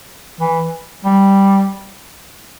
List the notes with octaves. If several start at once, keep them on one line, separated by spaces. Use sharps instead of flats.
E3
G3